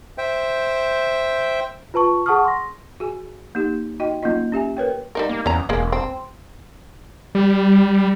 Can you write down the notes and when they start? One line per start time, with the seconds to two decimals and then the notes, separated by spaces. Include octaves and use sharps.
0.18 C5 E5 G5
1.94 F4 B4 A5 C#6
2.26 G#4 F#5 A5 C#6 D#6 F6
2.45 C6 A#6
3.00 F#4 G#4 G#5
3.55 A#3 D#4 G4
3.99 D#4 F#4 D#5 G5
4.23 F#3 A#3 C#4 D#4 F4 D#5
4.52 C#4 G4 E5 G#5
4.77 A#4 B4 C#5 G5
5.15 G3 D#4 A#4
5.29 A#3
5.46 E2 C#4 A#5
5.69 E1 G#3 A#3 C#4
5.92 C4
7.35 G3